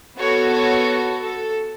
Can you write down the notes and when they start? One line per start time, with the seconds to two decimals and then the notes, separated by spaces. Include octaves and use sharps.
0.17 B3 F#4 A4 C#5
0.52 C#5
1.22 A4